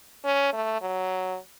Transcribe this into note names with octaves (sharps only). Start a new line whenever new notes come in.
C#4
A3
F#3